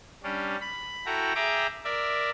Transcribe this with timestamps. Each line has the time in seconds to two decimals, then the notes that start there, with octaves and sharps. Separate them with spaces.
0.23 G3 C#4 D4
0.61 B5
1.06 E4 F#4 A4 G5 A#5
1.35 G#4 E5 G5 A#5 D6
1.84 A#4 D5 E5